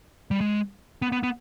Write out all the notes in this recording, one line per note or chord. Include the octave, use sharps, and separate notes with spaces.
G3
G#3
B3
B3
B3